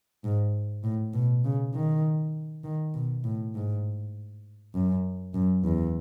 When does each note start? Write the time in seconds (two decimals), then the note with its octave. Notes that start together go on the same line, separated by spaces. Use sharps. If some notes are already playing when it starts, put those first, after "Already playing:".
0.24 G#2
0.84 A2
1.14 B2
1.44 C#3
1.74 D#3
2.64 D#3
2.94 B2
3.24 A2
3.54 G#2
4.75 F#2
5.34 F#2
5.64 E2